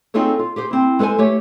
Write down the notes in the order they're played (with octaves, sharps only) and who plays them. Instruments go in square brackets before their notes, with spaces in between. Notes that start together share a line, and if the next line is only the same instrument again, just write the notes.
[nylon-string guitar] C4 D#4 F4 G#4 A4 C#5
F4
G4 G#4 C5
C4 E4
G#3 A4 B4 C5 G#5
A3 G4 C#5